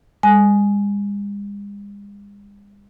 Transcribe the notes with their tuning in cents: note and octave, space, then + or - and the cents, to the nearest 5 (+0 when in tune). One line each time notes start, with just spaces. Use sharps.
G#3 -45 G#5 +15